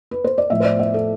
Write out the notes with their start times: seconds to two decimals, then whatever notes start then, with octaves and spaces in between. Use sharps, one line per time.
0.11 B4
0.24 C5
0.38 D5
0.50 A2 F3 E5
0.60 C5
0.65 D5
0.79 E5
0.94 A4